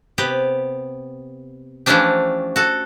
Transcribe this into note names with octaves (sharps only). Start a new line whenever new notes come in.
C3 B3 G4
E3 F3 A3 C#4 D4 G4
F#4 A4